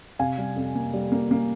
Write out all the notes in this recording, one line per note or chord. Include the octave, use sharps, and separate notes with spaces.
C3 F5 G#5
G3
F2
A#3
G3
A#3
A#3